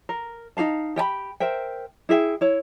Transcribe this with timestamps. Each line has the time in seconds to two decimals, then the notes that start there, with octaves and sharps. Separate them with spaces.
0.09 A#4
0.57 D#4 G#4 F5 A5
0.96 G4 G5 A5 B5
1.40 A#4 C5 E5 G5
2.09 E4 G#4 E5 G5
2.41 E4 C#5